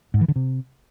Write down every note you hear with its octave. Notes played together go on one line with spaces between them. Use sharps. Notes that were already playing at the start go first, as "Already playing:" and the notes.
G#2
E3
D3
C3